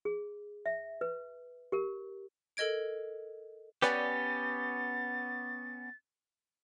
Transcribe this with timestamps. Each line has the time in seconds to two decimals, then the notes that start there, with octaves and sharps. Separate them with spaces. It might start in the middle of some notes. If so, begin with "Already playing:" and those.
0.05 G#4
0.66 E5
1.01 B4
1.72 G4 A#4
2.57 A4 A#4 D#5 G#6 D7
3.82 B3 C#4 G4 B4 D5 G#5 A6